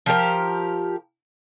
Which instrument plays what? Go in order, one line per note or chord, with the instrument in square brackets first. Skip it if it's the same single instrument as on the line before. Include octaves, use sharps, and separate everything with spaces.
[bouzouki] F3 G4 A#4